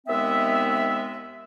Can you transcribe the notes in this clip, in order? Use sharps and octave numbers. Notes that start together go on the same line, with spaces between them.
D#2 G#3 B3 C4 E5